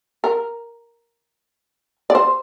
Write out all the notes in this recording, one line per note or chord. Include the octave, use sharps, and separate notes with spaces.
A#4
D5
C5